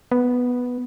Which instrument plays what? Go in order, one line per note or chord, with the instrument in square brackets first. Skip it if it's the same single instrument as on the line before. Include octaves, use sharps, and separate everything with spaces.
[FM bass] B3